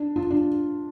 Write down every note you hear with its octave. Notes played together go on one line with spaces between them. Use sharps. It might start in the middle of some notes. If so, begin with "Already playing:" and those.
Already playing: D4
F4
D4